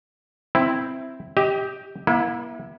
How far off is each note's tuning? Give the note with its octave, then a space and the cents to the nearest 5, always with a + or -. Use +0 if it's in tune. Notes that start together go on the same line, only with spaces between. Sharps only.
C4 +0 E4 +0
G4 +0 D#5 +35
A#3 +45 E4 +0